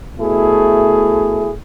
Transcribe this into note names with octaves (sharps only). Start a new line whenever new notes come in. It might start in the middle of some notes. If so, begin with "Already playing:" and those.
B2 A3 E4 G#4